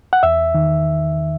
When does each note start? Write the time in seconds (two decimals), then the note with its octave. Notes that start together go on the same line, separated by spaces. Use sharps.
0.13 F#5
0.23 E2 E5
0.55 D#3